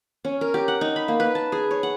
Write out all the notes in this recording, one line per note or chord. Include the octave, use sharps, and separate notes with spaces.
C#4
A#4
G4
F#5
D#4
B5
A#3
B4
A5
G#4
C#5
F#5